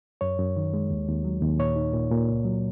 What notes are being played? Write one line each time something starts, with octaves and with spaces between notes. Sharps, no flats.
F#2 C#5
F#2
D#3
G#3
D#2
D#2
F#3
D#2
A#2 C#5
D#4
A#2
A#2
C#2
F#3